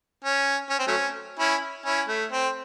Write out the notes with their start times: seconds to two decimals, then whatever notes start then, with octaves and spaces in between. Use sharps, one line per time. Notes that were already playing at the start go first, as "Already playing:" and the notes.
0.24 C#4
0.70 C#4
0.79 C4
0.87 F#3 A3 C#4
1.39 C#4 E4
1.85 C#4 E4
2.08 A3
2.32 C4